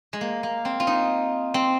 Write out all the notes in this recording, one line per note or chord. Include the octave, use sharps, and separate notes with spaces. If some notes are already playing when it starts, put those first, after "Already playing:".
G#3
A#3
A#3
C4
F4
D#4
C4